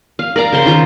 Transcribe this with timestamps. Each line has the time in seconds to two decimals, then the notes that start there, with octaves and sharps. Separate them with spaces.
0.19 F5
0.36 A#4 D5 F5 A#5
0.52 C#3 C5 C6
0.66 D#3 F4 A#5